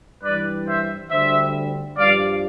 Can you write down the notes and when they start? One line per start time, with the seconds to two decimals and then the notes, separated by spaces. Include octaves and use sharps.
0.23 G2 E3 G3 B4 D5
0.67 C5 E5
1.11 D2 D3 G3 C5 E5
1.98 G2 F3 D5 F5